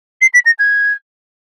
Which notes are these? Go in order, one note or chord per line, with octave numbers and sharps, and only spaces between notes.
C7
B6
A#6
G#6